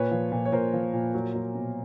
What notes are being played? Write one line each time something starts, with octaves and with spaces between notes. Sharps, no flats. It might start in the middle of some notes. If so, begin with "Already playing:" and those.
Already playing: A#2 B4 C#5
F3
A#2
C#5
A#2 A#4 C5
F3
A#2
F#3
F#3
B2